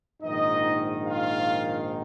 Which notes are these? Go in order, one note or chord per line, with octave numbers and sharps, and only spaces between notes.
A#1 G#2 D#3 D#4 D#5
F4 F5